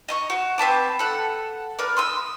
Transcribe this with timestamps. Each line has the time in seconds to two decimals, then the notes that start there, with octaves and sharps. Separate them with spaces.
0.08 D#5 A#5 C#6
0.30 F#4
0.58 C4 B4 A5 D6
0.99 A4 F#5
1.79 A#4 B4 D5
1.97 C6 D#6 E6